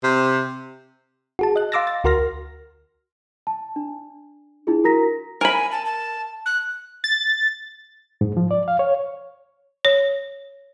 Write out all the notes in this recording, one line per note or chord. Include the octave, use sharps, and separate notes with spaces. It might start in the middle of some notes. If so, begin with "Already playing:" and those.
C3
F#4 G#4 A5
D#5 F#6
F5 C6 D6 E6 A6 A#6
A6
D2 F#4 A#4 C6 F6 A#6
A5
D4
D4 E4 F4 G#4
F#4 A#4 A#5 A#6 B6
A#4 G#5 B5
A5
A5
F#6
A6
G#2
F3
D5
F5
C#5
C#5